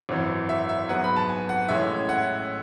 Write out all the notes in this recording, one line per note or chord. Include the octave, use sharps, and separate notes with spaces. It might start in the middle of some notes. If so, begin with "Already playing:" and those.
G#1 F#2 E3
E5
E5
G#2 F#3 B3 F#5
B5
A5
G#5
F#5
A1 A2 G#3 C#4 E4 E5
F#5